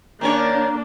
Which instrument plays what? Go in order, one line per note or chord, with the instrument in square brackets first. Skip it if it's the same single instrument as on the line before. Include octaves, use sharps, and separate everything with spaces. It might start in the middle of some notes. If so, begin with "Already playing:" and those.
[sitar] D#3 C#4 C#5 [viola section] A#3 D4 [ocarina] A#5